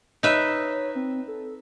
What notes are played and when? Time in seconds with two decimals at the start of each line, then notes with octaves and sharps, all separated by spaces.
0.23 D#4 B4 C#5 E5
0.95 C4
1.28 A4